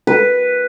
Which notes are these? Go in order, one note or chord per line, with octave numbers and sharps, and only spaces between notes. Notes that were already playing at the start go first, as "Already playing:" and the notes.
B4